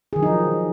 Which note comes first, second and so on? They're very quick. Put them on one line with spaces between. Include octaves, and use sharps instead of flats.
G#4 D#3 F#3 D#4 F3